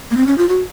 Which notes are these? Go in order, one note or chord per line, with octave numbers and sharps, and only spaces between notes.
A#3
C4
C#4
F4
F#4